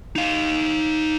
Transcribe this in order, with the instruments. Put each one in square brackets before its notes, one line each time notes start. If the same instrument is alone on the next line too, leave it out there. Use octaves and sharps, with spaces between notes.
[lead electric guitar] D#4 F5